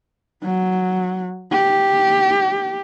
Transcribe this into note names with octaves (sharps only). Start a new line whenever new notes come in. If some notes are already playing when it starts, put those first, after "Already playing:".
F#3
G4